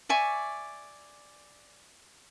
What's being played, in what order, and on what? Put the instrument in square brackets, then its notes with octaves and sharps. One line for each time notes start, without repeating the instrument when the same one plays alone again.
[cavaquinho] D5 E5 G#5 C#6